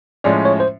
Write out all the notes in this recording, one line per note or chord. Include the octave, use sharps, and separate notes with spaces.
A2 F3 G#3 C#4 D5
C#5
C5